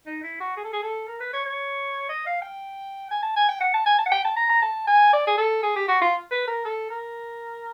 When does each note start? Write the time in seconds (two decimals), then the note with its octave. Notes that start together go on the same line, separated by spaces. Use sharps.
0.06 D#4
0.23 E4
0.40 F#4
0.56 G#4
0.64 A4
0.72 G#4
0.82 A4
1.07 A#4
1.20 B4
1.33 C#5
1.45 C#5
2.09 D#5
2.26 F5
2.42 G5
3.11 G#5
3.22 A5
3.36 G#5
3.49 G5
3.60 F#5
3.74 A5
3.86 G#5
3.98 A5
4.06 F#5
4.11 G5
4.24 A5
4.36 A#5
4.49 A#5
4.62 A5
4.87 G#5
5.13 D5
5.27 G#4
5.37 A4
5.63 G#4
5.76 G4
5.88 F#4
6.01 F4
6.31 B4
6.47 A#4
6.65 A4
6.90 A#4